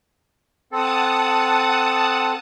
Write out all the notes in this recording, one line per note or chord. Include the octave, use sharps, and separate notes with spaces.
C4 A4 F#5 A5 D#6